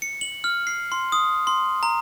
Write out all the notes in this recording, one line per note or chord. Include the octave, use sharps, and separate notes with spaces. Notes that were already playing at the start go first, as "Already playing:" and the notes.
C#7
F#7
F6
C7
C6
D#6
C6
A#5